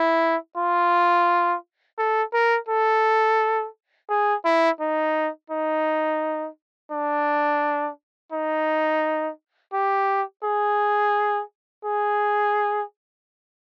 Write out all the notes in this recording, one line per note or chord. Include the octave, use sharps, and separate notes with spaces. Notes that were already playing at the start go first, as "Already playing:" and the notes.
Already playing: E4
F4
A4
A#4
A4
G#4
E4
D#4
D#4
D4
D#4
G4
G#4
G#4